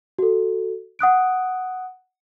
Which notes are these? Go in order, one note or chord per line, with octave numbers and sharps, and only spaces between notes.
F#4 A4
F#5 D#6 F#6 D7